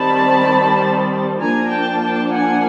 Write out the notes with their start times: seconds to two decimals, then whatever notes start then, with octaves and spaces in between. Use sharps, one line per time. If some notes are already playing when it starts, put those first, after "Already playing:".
Already playing: D#3 G3 C4 A5 B5
1.40 F3 A#3 D4 G#5 A#5
1.71 G5 A5
2.02 G5 A5
2.33 F#5 G#5